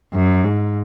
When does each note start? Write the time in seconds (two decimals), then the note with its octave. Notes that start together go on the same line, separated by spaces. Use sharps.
0.13 F#2
0.44 G#2